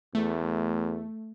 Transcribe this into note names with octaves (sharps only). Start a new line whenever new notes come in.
E2 A3